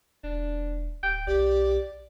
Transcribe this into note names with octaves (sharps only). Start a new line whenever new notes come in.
E1 D4
D1 G5
B1 G4 D5